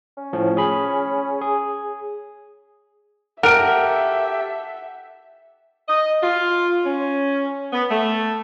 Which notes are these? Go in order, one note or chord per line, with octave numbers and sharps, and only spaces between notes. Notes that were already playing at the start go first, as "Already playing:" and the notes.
C#4
A2 F3
G#4 B5
G#4
G4 A4 A#4 E5 F#5 D7
D#5
F4
C#4
B3
A3